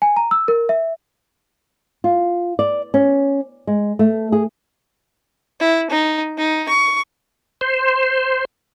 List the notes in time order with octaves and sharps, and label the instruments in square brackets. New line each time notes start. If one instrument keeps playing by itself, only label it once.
[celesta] G#5
A#5
E6
A#4
E5
[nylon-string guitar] F4
D5
C#4
G#3
A3
G#4
[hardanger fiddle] E4
D#4
D#4
C#6
[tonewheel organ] C5